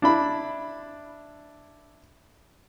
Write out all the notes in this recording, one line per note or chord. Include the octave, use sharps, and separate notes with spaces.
D4 E4 B5